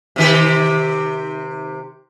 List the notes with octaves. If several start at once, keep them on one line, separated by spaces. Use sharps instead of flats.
C3 D#3 G4